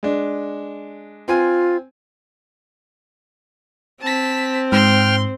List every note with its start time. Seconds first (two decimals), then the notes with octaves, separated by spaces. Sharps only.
0.03 G#3 D4
1.28 C4 F4 G#5
4.02 C4 A5 B6
4.72 G#2 G5 C6 F6